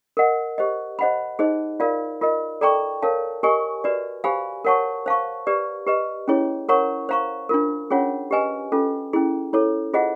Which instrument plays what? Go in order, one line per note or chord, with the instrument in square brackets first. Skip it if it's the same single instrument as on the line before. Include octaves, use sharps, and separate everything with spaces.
[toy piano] A#4 D#5 F#5
G4 C5 D#5
C5 D#5 F#5 B5
D#4 G#4 C5 D#5
F4 A#4 D5 F5
F4 A#4 D#5
A4 D5 G5 A#5 C#6
A#4 C#5 F5 A5
G4 A#4 D#5 G#5 C#6
F#4 B4 D5
G4 C5 F5 G#5 B5
A#4 C#5 F#5 A5 C#6
C5 F5 A5 C#6
G4 B4 D5
G4 B4 D#5
C#4 E4 G#4 C#5
A#4 C#5 F#5 A#5 C#6
C5 F5 A#5 C#6
D4 F4 A#4
C#4 F4 G#4 C#5 F#5
G4 B4 D#5 G#5
C#4 F4 A4
C#4 E4 G#4
E4 A4 C#5
F4 G#4 C5 D#5 F#5